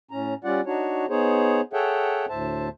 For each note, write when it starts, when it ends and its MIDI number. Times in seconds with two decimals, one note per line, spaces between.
0.11 0.34 45
0.11 0.34 61
0.11 0.34 82
0.44 0.61 55
0.44 0.61 61
0.44 0.61 65
0.44 0.61 74
0.44 0.61 78
0.66 1.06 62
0.66 1.06 63
0.66 1.06 66
0.66 1.06 73
1.09 1.61 59
1.09 1.61 63
1.09 1.61 68
1.09 1.61 72
1.09 1.61 73
1.73 2.26 68
1.73 2.26 69
1.73 2.26 73
1.73 2.26 76
1.73 2.26 78
1.73 2.26 79
2.29 2.69 38
2.29 2.69 45
2.29 2.69 72
2.29 2.69 76
2.29 2.69 81